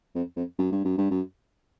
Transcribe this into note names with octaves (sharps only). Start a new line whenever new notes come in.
F2
F2
F#2
G2
F#2
G2
F#2